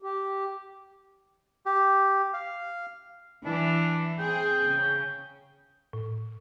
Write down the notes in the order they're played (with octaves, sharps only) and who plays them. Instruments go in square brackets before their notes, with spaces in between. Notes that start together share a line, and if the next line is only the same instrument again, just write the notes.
[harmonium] G4
[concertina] G4
F5
[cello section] E3 [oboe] D4
[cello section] C4 G#4 [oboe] G5
[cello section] C#3
[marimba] A2